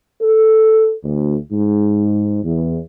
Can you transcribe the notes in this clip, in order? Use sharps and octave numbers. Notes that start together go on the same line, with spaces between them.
A4
D2
G#2
E2